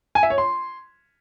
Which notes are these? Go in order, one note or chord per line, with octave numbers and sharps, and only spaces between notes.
G#5
E5
C#5
C6